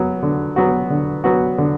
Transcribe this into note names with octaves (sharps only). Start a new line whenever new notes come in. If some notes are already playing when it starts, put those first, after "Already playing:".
Already playing: F#3 B3 F#4
D3
F#3 B3 F#4
D3
F#3 B3 F#4
D3